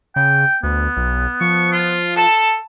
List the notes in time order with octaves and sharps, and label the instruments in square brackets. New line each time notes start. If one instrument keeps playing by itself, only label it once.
[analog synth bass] C#3 [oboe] G5
[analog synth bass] D2 [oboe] B3
[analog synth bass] B1
[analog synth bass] F3 [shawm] C#6
[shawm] F4
[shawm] A4 [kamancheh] A5